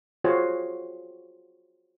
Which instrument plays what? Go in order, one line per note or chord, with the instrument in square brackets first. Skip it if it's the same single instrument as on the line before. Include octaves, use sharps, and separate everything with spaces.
[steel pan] F4 F#4 G#4 C5 C#5